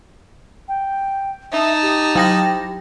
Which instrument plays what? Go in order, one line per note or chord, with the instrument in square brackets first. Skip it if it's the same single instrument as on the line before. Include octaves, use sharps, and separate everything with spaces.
[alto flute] G5
[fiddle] D#4 A5 [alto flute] E5
[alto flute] G4
[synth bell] F#3 G5 A#6